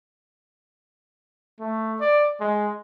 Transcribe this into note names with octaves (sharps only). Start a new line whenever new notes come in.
A3
D5
G#3